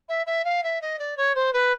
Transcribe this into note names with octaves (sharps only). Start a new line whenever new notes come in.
E5
E5
F5
E5
D#5
D5
C#5
C5
B4